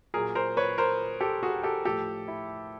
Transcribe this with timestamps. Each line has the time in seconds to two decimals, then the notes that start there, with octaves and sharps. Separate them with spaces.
0.14 A#2 F#3 G#4 A#4
0.35 A#4 C5
0.57 B4 C#5
0.78 A#4 C5
1.20 G4 A4
1.43 F#4 G#4
1.63 G4 A4
1.85 A2 F3 G4 A4
2.28 E4